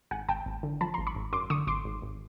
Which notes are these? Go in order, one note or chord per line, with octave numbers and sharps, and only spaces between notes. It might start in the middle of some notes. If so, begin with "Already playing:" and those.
G#1 F#5 G#5
G#1 G5 A5
G#1
D3
F3 A5 B5
G#1 A#5 C6
B5 C#6
G#1
F#2 C6 D6
D3 C#6 D#6
G#1 C6 D6
G#1
G#1